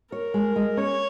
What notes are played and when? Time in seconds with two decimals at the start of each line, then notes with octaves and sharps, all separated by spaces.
0.12 A#4 C#5
0.34 G#3
0.56 G#3
0.77 C#4 C#5